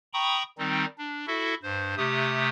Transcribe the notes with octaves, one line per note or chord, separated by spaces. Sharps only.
G5 A#5 B5 C#6 D#6
D#3 G3 C4 D#4
D4
E4 F#4 A4 E5
G2 C5
C3 A3 G4 D#6